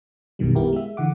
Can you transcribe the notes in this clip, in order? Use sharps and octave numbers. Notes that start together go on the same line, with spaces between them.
B1 F#2 B2 D#3 G3
B3 E4 G4 A#4
G#3 E5
D3 E3 F#5 D6